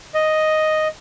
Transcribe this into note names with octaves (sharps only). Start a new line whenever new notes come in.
D#5